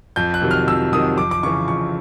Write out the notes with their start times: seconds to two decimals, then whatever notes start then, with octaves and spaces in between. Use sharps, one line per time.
0.16 F2 G6
0.34 F#6
0.42 C3 D#3 F#3
0.51 F6
0.68 F2 E6
0.93 C3 D#3 F#3 D#6
1.18 F2 D6
1.31 D6
1.43 C#3 E3 C#6
1.68 F2 C#6